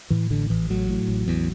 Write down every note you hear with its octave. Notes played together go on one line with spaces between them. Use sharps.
A2 E3
A1 D3
A1 E3
A2 F#3
A2
A1
E2